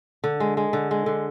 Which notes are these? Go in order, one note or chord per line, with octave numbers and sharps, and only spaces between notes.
D3
G#3
G#3
D3
G#3
D3